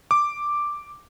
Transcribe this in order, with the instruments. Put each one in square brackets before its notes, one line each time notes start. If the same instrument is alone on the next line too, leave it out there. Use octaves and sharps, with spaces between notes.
[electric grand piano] D6